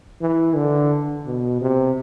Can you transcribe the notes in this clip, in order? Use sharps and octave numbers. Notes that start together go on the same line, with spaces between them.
E3
D3
B2
C3